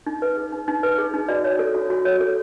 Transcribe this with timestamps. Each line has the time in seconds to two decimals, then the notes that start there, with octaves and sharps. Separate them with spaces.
0.06 D#4
0.22 B4
0.37 G#4
0.52 D#4
0.68 D#4
0.83 B4
0.98 G#4
1.14 D#4
1.28 F#4 D5
1.44 C#5
1.59 A4
1.75 F#4
1.90 F#4
2.05 C#5
2.21 A4